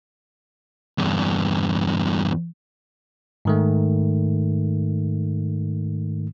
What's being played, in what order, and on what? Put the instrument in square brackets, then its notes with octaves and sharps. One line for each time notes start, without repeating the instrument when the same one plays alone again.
[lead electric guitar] E2 G2
[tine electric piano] G#2 D#3 A3